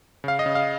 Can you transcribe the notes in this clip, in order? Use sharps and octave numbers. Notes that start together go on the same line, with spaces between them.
C#3 F5
D#5
C#3
F5